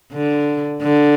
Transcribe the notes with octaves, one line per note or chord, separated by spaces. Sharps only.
D3
D3